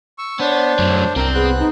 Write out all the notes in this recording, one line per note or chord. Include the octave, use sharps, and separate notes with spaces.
C#6 E6
B3 D4 C5 C#5
F#2 F#3 A3
C2 C4 A#4 G5
B3 G#4 C5 F#6
D#4